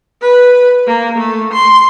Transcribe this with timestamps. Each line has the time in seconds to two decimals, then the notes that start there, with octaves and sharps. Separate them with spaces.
0.22 B4
0.87 A#3
1.18 A3
1.53 C6